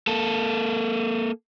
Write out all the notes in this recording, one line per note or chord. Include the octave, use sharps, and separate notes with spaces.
A#3 A4